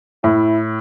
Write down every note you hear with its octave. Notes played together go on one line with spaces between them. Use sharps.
A2 E4